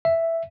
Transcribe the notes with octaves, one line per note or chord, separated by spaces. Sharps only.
E5